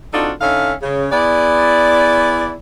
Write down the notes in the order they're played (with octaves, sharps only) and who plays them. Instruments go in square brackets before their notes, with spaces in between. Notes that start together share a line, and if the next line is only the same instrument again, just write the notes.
[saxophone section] C4 D4 D#4 F4 F#4 A4
D3 C#4 D#4 E5 F5
C#3
B3 E4 G#4 D5